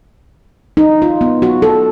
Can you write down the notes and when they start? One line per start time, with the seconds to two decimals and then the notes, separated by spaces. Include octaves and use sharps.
0.77 D#4
1.02 F4
1.21 B3
1.42 F#4
1.62 A4